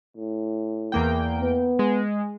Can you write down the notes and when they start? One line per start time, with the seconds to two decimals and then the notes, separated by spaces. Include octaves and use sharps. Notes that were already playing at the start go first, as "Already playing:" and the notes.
0.16 A2
0.92 E2 A#3 G5
1.42 B3
1.79 G#3